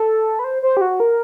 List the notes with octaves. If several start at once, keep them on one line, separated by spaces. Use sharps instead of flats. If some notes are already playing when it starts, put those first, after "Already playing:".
Already playing: A4
B4
C5
C5
G4
F#4
A#4